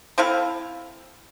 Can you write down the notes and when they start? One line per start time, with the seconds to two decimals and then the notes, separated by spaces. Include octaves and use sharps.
0.18 C4 E4 A4 F5